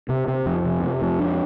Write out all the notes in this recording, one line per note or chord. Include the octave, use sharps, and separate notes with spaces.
C3
C3
F2
C3
C3
F2
D4